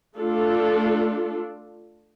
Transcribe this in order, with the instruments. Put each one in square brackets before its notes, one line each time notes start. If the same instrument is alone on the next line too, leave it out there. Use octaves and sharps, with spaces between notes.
[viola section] A3 D4 F4 A4